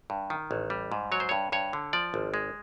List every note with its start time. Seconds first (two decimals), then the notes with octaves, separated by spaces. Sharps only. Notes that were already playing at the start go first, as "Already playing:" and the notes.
0.10 G2
0.30 D#3
0.51 A1
0.70 G3
0.92 G#2
1.12 F#3 C#5
1.20 C5
1.29 G2 C#5
1.52 G2 C#5
1.73 D3
1.93 F3 D5
2.14 G#1
2.34 G#3